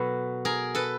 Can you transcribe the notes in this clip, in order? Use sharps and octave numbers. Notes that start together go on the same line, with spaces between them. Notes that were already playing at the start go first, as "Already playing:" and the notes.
Already playing: B2 F#3 A4 B4
G#4 A#4
A4 B4